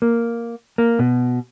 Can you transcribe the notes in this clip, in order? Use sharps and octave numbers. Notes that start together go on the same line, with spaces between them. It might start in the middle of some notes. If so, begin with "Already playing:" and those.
A#3
A#3
B2